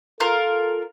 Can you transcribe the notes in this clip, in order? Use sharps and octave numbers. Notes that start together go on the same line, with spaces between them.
F4 A4 A#4